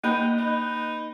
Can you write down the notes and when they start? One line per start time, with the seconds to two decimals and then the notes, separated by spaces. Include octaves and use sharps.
0.04 A#3 D#4 B4 G5
0.38 D#4